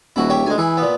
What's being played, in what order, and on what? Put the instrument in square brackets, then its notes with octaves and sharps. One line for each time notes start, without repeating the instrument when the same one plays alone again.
[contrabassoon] D#1 [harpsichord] E4 F#4
[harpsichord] G4 C#5 E5
[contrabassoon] D2 [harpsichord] G#3 G#5
[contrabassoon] E3 [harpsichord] G#4 B5
[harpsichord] A#2 B3